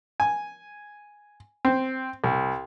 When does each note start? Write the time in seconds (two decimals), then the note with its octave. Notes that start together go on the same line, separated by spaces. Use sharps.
0.20 G#5
1.65 C4
2.24 C2